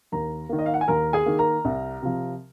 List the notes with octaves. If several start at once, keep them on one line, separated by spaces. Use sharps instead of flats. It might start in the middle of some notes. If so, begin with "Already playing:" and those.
D#2 A#4 A#5
D#3 A#3
D#5
F5
F#5
G#5
D#2 A#4 A#5
G#4 G#5
D#3 A#3
A#4 A#5
C2
C3 F3